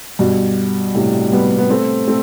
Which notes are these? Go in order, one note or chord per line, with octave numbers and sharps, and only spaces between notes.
G2 B2
A2 C3
G3 B3
B3
A3 C4
A3 C4